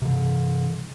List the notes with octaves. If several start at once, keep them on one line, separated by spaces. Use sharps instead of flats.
C3 E3